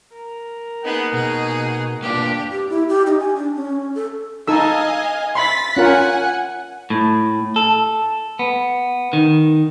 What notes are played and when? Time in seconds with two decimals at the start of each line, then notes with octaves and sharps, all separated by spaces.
0.13 A#4
0.85 A#3 B3 D#4 G#4 F#5
1.13 B2 G#4
2.03 A#3 B3 D4 F4 G4
2.51 G4
2.70 E4
2.89 G4
3.07 D#4
3.20 G#5
3.36 D4
3.56 C#4
3.95 A4
4.48 D#4 A4 D#5 F5 G#5 E6
5.35 E5 B5 C6 A6 B6
5.77 C#4 F4 A#4 F#5 G#5
6.90 A2
7.56 A4
8.39 B3
9.13 D#3